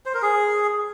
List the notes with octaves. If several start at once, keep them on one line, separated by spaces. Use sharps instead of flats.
C5
A#4
G#4